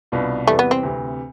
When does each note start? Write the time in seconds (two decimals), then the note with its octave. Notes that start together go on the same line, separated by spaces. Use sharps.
0.12 C2 B2 B3 D4 F4
0.47 E2 C3 E3 G3 A3
0.59 B3
0.71 C4
0.83 D2 C3 E3